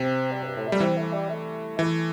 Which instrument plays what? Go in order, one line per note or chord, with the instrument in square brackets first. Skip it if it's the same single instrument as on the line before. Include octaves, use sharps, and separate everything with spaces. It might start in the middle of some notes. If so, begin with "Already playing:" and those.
Already playing: [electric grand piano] C3 [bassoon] C4
[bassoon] G3
G2
A2
[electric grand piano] G3 [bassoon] A3
[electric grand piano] E3 [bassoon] C4
[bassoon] A3
G3
A3
[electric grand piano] E3 [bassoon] A3